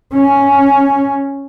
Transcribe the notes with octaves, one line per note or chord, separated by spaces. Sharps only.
C#4